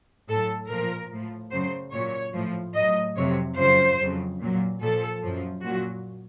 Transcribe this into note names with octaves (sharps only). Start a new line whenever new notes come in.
A2 F#3 A4
A#2 F3 A#4
A2 F3
F#2 C#3 F#3 C5
A#2 F#3 C#5
A2 F3
A2 F#3 D#5
F2 C3 F#3 C#5
F#2 C#3 F3 C5
F2 C#3 F#3
A#2 F#3
A#2 F3 A4
F#2 F3
A#2 F#3 F#4